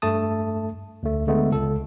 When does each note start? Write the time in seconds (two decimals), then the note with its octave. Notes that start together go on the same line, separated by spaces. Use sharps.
0.02 G2 A3 A5 D#6
1.03 D2 A3
1.27 D3 G#3 A3 B3
1.51 C#2 A4